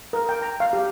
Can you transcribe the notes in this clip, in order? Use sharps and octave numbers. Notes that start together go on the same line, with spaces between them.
A#4
G5
A#5
F5
G4